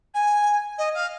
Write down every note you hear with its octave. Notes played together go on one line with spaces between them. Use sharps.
G#5
D#5
F5